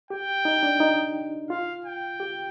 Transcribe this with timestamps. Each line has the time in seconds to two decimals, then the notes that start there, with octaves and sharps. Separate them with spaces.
0.10 G4 G5
0.45 D#4
0.63 D4
0.80 D#4
1.50 F4 F5
1.85 G5
2.20 G4